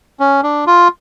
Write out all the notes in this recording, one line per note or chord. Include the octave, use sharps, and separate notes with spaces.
C#4
D4
F4